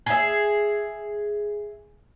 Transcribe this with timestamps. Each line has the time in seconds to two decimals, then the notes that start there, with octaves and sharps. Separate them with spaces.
0.06 G#4 E5